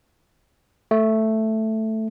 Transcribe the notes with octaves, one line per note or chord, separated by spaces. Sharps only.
A3